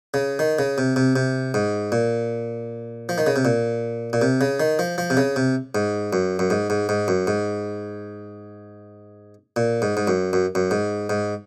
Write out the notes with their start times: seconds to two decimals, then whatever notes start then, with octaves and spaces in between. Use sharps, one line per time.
0.14 C#3
0.39 D#3
0.59 C#3
0.78 C3
0.96 C3
1.16 C3
1.54 G#2
1.92 A#2
3.09 F3
3.18 D#3
3.27 C#3
3.36 C3
3.45 A#2
4.13 A#2
4.22 C3
4.41 C#3
4.60 D#3
4.79 F3
4.98 F3
5.10 C3
5.17 C#3
5.36 C3
5.75 G#2
6.13 F#2
6.39 F#2
6.50 G#2
6.70 G#2
6.89 G#2
7.08 F#2
7.27 G#2
9.56 A#2
9.82 G#2
9.97 G#2
10.07 F#2
10.33 F#2
10.55 F#2
10.71 G#2
11.09 G#2